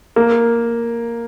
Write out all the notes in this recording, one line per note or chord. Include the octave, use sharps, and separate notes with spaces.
A#3